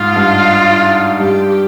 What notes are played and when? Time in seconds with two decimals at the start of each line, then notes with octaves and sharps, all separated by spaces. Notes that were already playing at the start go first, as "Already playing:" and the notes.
Already playing: G#2 F4
0.16 G2
1.19 G2 G4